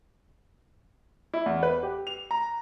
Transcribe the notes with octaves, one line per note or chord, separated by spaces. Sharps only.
E4
E2
B4
G4
F7
A#5